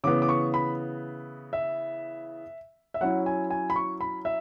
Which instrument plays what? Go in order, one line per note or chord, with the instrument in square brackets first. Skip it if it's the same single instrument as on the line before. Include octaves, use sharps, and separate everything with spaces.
[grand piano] C#3 E3 B3 D6
D6
C#6
B5
E5
E5
F#3 C#4 E4 F#5
G#5
G#5
B5
C#6
B5
E5